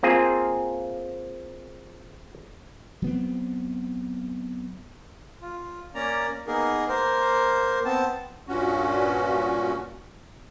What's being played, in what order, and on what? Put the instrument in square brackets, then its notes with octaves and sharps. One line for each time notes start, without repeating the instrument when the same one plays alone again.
[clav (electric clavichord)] A#3 C4 F4 G#4
[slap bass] F#3 B3 C4
[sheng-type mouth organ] F4
A#3 C#4 D5 A#5
A#3 B3 D#4 G#4 A#4
A#3 A#4 C5
B3 C4 A5
[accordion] G2 A#2 C#4 F#4